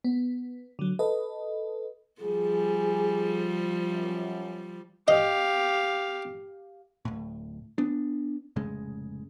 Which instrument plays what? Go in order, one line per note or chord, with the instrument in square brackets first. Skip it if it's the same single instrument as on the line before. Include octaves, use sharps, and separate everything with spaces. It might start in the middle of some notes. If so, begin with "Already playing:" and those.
[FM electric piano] B3
D3 F#3
A4 B4 D#5
[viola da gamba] F3 G3 [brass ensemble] G#4
[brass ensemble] F#2
[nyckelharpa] G4 F5 [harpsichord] D#5
[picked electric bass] D1 A2
B3 D4
F1 A2 C#3 G#3